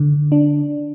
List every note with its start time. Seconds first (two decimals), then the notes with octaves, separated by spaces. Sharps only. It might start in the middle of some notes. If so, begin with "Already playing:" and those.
Already playing: D3
0.32 D4